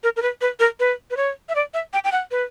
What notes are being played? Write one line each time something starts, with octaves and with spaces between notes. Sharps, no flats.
A#4
A#4
B4
B4
A#4
B4
B4
C#5
E5
D5
E5
G5
G5
F#5
B4